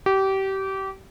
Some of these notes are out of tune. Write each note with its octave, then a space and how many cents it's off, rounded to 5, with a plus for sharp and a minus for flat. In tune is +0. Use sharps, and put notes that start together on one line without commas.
G4 -25